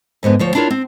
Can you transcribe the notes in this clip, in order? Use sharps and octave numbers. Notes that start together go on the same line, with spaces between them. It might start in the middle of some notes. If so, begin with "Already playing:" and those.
F2 G#2 D3 B3
D2 F3 C#5
D4 E4 F4 A#4 C#5
C4